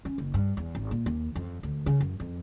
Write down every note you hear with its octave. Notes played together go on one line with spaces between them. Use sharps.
C#4
F#1
G2
E2
G#1
A#2
D#2
F2
D2
C#3
F#2
F2